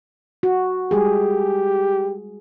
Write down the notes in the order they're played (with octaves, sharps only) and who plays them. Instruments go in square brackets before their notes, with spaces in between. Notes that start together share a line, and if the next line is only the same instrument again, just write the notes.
[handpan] F#4
[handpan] G3 G#3 G#4 [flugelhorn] G4